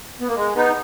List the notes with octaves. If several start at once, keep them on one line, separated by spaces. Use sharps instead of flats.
B3
A#3
G#3
B3 D#4